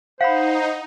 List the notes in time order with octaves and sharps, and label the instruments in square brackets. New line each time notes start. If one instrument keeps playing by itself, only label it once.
[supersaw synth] D#4 [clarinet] C5 [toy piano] F5 B5 [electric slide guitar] F#5